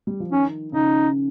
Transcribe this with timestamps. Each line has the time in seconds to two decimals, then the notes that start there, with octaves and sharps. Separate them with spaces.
0.07 G3
0.20 F3
0.32 D#3 C#4
0.72 C#3 D#4